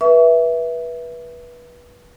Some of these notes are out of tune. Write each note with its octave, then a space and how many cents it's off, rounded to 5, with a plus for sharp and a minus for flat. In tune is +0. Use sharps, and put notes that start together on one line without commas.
B4 -25 E5 +0 C#6 +40